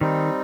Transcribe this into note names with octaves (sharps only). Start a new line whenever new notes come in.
D#3 G3 C4 D#4